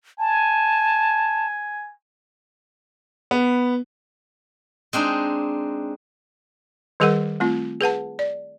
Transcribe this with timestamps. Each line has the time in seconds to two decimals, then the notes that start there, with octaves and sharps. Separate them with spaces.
0.19 G#5 A5
3.31 B3
4.93 G#3 C4 D4 D#4
7.00 D#3 G3 G#4 A#4 F#5
7.40 A3 C4 F4
7.81 G#4 B4 F#5 A5
8.19 D5